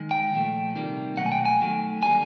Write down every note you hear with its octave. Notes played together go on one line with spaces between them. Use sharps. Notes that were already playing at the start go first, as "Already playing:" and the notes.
Already playing: D#3 G#3
G5
A#2 F3 A3
C3 D#3 G3 A#3
B2 F#3 A3 F#5
G#5
G5
G#5
D#3 F#3 A3
D3 G3 A#3 G#5